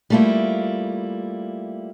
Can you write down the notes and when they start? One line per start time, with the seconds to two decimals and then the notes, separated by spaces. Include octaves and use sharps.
0.10 G3 A3 A#3 E4 F4